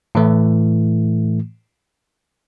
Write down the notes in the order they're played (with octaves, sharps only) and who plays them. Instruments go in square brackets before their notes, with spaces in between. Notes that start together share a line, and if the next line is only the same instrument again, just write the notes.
[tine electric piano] A2 E3 A3